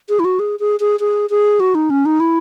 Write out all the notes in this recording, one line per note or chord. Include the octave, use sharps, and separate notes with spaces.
G#4
E4
F#4
G#4
G#4
G#4
G#4
G#4
F#4
D#4
C#4
D#4
E4